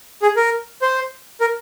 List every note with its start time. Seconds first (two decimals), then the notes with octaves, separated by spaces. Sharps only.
0.22 G#4
0.36 A#4
0.82 C5
1.41 A#4